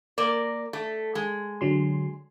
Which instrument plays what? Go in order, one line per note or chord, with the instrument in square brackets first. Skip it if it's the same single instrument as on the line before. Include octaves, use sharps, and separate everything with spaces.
[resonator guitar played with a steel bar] A#3 A#4 D5
A3
G#3
[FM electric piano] D3 F#3 C6